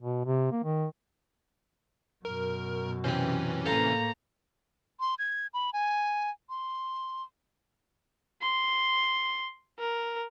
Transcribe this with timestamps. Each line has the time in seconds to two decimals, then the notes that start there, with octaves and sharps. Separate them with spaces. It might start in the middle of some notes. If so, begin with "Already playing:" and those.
0.01 B2
0.25 C3
0.52 A#3
0.64 D#3
2.25 F#2 B2 A#4
3.04 C3 E3 C4 C#4 C5
3.66 A2 A#3 A4 C5 F5 A#5
5.00 C6
5.19 G#6
5.54 B5
5.73 G#5
6.49 C6
8.42 C6
9.79 A#4